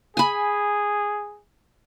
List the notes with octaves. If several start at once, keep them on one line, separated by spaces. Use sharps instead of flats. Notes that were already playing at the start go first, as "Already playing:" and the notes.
G#4 G#5 B5